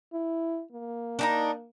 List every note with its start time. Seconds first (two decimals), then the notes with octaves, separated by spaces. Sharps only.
0.13 E4
0.72 A#3
1.19 D4 D#4 A#4